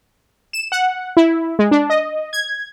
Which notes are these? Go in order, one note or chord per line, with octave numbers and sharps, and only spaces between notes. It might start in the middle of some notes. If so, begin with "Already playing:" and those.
E7
F#5
E4
G#3
D4
D#5
G#6